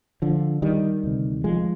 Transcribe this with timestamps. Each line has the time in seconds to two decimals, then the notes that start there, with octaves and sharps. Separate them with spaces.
0.22 D3 F3
0.62 D#3 G3
1.03 D2 C3
1.44 F3 G#3